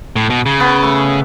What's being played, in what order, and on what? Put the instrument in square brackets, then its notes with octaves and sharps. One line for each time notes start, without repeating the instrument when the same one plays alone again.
[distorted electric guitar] A2
B2
C#3
[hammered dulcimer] B3
A3